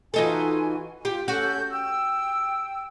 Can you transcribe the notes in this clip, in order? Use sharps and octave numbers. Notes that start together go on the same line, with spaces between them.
E3 D#4 F4 F#4 A4 G#5
F4 G4
C#4 F#4 A4 G6
G5 E6